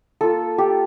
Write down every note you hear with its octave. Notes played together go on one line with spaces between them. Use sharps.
A#3 F4 A4
G4